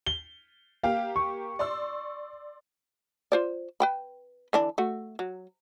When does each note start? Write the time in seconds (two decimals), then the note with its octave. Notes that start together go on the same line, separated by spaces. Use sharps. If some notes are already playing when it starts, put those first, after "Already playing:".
0.06 G7
0.83 A#3 G4 F5 G5
1.16 C#6
1.59 D5 C6 E6
3.32 F4 C5 D5
3.80 B4 G5 B5
4.53 D3 E3 D4
4.78 A3 F#4
5.19 F#3